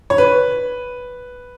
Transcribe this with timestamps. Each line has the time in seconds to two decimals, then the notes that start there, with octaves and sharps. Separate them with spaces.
0.10 C#5
0.18 B4